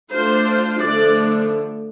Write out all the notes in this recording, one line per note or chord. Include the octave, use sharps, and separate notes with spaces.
A3 D4 F4 C5
D3 F3 A3 D4 D5